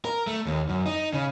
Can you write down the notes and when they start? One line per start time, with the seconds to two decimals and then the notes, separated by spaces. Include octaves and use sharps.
0.05 A#4
0.27 A3
0.46 D#2
0.69 F#2
0.86 D#4
1.13 C#3